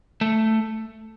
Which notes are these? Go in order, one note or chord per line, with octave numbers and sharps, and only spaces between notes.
A3